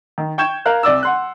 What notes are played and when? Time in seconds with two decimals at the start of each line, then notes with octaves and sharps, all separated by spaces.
0.18 D#3
0.38 G5 C#6 G6 G#6 E7
0.66 A#4 F5 F#6
0.83 C2 D5 D6 E6
1.03 F#5 C6 F#6